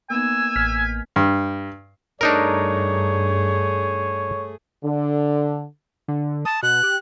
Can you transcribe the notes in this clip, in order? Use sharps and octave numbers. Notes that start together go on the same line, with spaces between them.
A#3 B3 D#4 G#5 E6
A1 F6 B6
G2
G2 A3 D4 D#4 G#4 A#4 C#5
D3
D3
A5 D#6
B2 F#6
G4